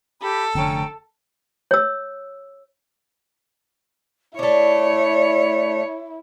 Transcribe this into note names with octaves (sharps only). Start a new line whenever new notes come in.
G4 A4 B5
F1 D3 C#4 G5 A#5
C#5 E6
A3 D4 E4 C#5 D5